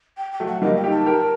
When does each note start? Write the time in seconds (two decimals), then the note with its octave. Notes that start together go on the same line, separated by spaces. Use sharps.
0.17 G5
0.32 G5
0.40 F#3 A3
0.48 F#5
0.62 G3 A#3 D#5
0.77 G5
0.84 D#4 G4
0.92 A5
1.06 G4 A#4
1.20 A#4